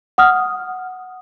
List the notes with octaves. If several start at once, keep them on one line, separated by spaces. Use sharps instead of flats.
F#5 D#6 F6